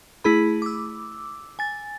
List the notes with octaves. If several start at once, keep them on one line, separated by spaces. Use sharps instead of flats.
A3 E4 G#4 B5
D6 E6
G#5 A6